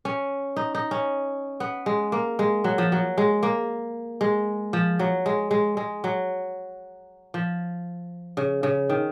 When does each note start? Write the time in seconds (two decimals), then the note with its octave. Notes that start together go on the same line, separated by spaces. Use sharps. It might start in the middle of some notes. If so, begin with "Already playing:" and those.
0.05 C#4
0.56 D#4
0.75 D#4
0.91 C#4
1.60 B3
1.86 G#3
2.12 A#3
2.39 G#3
2.64 F#3
2.78 F3
2.92 F#3
3.18 G#3
3.43 A#3
4.21 G#3
4.73 F3
4.99 F#3
5.26 G#3
5.51 G#3
5.77 G#3
6.04 F#3
7.34 F3
8.37 C#3
8.63 C#3
8.89 D#3